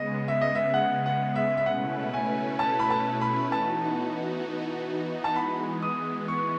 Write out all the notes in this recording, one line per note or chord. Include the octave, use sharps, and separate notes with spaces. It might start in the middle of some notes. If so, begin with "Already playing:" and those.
Already playing: C#3 G#3 B3 D#5
E5
D#5
E5
F#5
F#5
E5
E5
B2 A3 C#4 E4 B4 F#5
G#5
A5
B5
A5
B5
E3 B3 D#4 F#4 A5
A5
E3 G#3 B3 B5
D#6
C#6